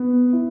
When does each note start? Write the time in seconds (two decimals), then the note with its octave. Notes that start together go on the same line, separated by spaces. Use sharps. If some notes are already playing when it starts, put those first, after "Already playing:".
Already playing: B3
0.33 E4